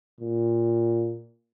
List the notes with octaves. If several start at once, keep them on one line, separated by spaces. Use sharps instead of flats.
A#2